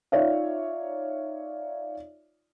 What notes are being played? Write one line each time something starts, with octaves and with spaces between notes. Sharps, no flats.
D#4 F4 C#5 D5 E5 F5